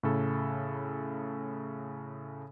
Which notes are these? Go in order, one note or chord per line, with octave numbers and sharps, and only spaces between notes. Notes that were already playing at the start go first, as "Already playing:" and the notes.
A2 C#3 A4